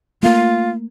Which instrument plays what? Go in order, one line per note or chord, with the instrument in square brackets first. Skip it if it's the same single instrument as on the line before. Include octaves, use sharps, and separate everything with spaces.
[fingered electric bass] A3 A#3 [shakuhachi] F4